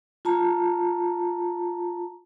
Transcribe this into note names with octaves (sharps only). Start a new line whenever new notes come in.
F4 A5 A#5